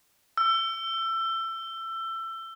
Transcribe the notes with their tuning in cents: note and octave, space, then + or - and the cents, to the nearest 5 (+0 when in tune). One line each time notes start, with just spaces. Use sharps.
E6 +25